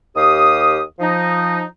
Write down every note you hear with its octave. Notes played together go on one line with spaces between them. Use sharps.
D#2 G4 F5 D#6
F3 D#4